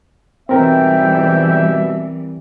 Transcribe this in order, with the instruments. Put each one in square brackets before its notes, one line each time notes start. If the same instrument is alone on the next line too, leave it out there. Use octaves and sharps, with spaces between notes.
[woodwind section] G#2 G5 [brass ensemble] B2 E5 [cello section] E3 G3 [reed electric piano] C4 A#4